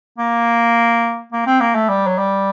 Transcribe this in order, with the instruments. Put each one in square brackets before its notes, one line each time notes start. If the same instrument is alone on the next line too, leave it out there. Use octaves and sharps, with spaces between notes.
[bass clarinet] A#3
A#3
C4
A#3
A3
G3
F#3
G3